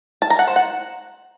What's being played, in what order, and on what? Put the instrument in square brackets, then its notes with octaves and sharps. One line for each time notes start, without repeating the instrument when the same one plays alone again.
[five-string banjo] A5
A#5
F#5
C5
F#5